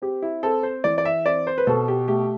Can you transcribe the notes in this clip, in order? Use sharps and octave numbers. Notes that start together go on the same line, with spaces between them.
C4 G4
E4
C4 A4
C5
E3 D5
D5
E5
C4 D5
C5
B4
B2 A4
G4
A3 G4